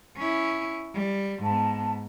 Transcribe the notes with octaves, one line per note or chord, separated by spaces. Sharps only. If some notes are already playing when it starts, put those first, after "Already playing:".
C#4 E4
G3
G#2 B3 A5